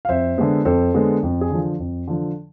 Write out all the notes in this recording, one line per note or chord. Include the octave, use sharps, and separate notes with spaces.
F5
F2 C5 E5
D3 G#3 B3
F2 A4 C5
D3 G#3 B3
F2
G#4
D3 F3
F2
D3 F3